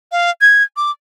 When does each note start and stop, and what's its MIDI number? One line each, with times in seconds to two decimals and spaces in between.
0.12 0.30 77
0.41 0.63 92
0.77 0.91 86